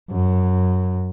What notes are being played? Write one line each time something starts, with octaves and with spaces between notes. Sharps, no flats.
F#2